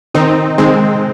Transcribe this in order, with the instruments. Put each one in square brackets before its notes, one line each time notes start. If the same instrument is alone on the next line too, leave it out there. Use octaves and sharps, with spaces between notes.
[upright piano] D#3 [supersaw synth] C4 D#4
[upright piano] D#3 [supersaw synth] G#3 C4